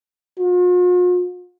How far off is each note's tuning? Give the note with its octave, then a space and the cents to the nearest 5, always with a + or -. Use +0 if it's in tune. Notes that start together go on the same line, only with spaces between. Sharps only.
F4 +45